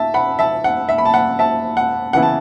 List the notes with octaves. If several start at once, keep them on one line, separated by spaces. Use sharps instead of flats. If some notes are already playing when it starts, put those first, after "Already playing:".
Already playing: E5 A5
F#5 B5
E5 A5
F#5
E5
B5
A5
F#5
E5 A5
F#5
C#3 E3 B3 E4 F#5
A5